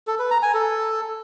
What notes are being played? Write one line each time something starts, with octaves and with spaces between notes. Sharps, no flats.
A4
B4
A#5
G#5
A4